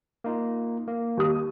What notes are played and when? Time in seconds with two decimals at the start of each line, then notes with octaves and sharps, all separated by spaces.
0.24 A#3 D#4 F4
0.88 A#3
1.17 D#2 G4 D#6